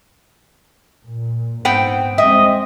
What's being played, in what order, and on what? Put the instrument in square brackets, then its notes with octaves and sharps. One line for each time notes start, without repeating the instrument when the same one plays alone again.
[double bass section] A#2
[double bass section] G#2 [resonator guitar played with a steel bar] B3 C4 G5
[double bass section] G#3 C4 [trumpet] D#5 [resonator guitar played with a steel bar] E5